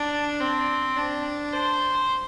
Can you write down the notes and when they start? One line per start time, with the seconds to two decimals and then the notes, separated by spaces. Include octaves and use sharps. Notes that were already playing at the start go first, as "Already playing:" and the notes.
Already playing: D4
0.40 C4
0.97 D4
1.52 C5